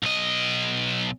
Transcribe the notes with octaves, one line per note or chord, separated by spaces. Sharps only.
B1 D#5